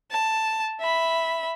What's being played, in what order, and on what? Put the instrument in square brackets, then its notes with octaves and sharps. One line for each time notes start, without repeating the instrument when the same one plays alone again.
[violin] A5
E5 B5